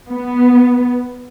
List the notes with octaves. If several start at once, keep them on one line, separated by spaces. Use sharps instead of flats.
B3